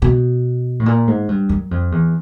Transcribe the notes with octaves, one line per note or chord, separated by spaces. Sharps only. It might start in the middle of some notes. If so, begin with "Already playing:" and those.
B2
A2
A#2
G#2
G2
F#2
F2
E2